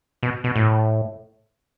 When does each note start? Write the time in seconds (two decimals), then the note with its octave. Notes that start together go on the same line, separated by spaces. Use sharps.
0.23 B2
0.44 B2
0.56 A2